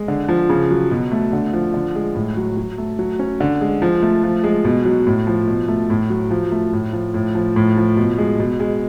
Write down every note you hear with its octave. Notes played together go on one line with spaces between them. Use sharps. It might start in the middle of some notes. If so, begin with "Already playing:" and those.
Already playing: G#3
D3
F3
C#3
F#3
B2
A3
D3
F3
D3
G#3
A2
F#3
F#3
A3
F#3
C#4
D3
G#3
F3
A3
F3
G#3
B2
F#3
A2
F3
B2
A3
A2
F#3
F3
A3
A2
F3
A2
F3
A2
F3
B2
G#3
B2
G#3